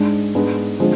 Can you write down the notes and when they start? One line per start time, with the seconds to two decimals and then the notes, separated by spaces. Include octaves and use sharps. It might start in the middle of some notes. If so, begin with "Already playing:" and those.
Already playing: G#2 G#3 D4
0.35 G#2 G#3 B3 D4
0.80 D3 F3 G#3 C4